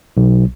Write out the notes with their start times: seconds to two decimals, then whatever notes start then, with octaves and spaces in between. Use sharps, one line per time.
0.17 B1